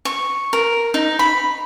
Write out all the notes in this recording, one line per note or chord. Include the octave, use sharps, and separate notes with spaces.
C#6
A#4
D#4
B5